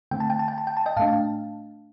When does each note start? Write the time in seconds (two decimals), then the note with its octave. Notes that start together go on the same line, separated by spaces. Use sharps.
0.11 D3 A3 C4 G5
0.20 A5
0.30 G5
0.39 A5
0.48 G5
0.58 A5
0.67 G5
0.77 A5
0.86 D#5 G5
0.97 A2 A3 D4 F5 A5